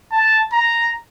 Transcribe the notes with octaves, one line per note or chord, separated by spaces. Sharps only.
A5
A#5